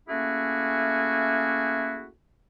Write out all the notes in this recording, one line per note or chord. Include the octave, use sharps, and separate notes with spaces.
A3 A#3 C#4 E4 F#4 G#4